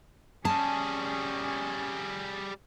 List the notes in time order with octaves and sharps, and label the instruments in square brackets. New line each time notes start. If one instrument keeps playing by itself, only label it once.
[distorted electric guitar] G3 G#4 [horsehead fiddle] C#4 [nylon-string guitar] A5